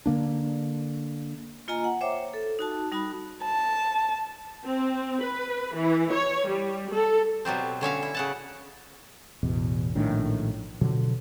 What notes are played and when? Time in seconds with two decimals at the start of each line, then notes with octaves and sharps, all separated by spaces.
0.06 D3 A#3 D4
1.68 A#3 F4 D#5 G#5 A#5
1.84 F#5
2.01 C5 C#5 E5 G5 D6
2.34 A4
2.59 D#4 F#4 A5
2.92 G3 D#4 F#4 B5
3.44 A5
4.65 C4
5.23 B4
5.76 E3
6.13 C#5
6.47 G3
6.93 A4
7.45 B2 F#3 G3 C4
7.81 D3 C#4 E5 F5
8.03 E4
8.14 C#3 F#5 A5
9.43 A1 E2 B2
9.95 A#1 A2 D#3 D4
10.81 B2 D3 F3 F#3